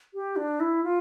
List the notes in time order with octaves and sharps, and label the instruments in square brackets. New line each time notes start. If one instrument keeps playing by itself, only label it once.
[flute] G4
D4
E4
F4